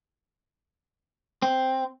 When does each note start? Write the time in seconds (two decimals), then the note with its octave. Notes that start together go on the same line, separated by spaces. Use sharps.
1.42 C4